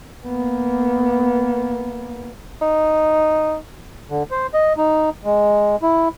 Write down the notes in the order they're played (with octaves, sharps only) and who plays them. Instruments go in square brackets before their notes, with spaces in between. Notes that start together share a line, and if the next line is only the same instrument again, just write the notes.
[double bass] A#3 B3
[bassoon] D#4
[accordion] D3
C5
D#5
D#4
G#3
E4